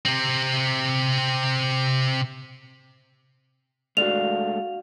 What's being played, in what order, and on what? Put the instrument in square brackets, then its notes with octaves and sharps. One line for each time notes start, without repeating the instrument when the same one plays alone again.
[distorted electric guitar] C3 C4
[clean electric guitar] G#3 A3 D4 [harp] F#4 F5 [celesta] F7